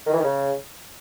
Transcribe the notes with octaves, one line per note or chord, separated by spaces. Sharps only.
D#3
E3
D#3
C#3